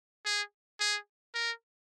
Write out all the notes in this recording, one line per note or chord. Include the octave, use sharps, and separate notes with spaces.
G#4
G#4
A#4